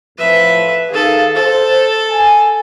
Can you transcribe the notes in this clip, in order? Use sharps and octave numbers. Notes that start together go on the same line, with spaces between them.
F2 A2 F3 B4 E5
D#3 G#4 A4 F5
A4 C5
G#5